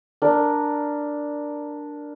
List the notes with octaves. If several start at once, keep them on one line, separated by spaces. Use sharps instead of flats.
D4 A#4